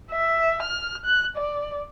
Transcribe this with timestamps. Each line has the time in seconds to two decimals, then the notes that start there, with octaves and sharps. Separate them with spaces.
0.12 E5
0.63 F6
1.05 F#6
1.36 D5